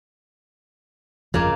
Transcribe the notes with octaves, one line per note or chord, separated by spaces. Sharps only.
G1 F2 C#3 F3 A#3